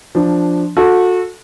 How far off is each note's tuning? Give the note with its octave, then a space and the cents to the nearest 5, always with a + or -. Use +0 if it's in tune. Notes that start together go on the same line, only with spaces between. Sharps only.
F3 +0 D4 +0
F#4 -30 A4 +0